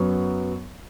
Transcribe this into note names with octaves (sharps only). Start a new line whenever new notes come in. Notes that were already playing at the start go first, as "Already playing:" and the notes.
Already playing: F#2 F#3 B3